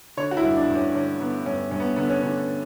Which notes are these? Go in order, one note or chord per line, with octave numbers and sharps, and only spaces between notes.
D3 C#5
F#4
E4
G2
D4
G2
C#4
D3 C#4
D3 B3
G2 C#4
G2 C#4
B3
D3 B3
C#4
D3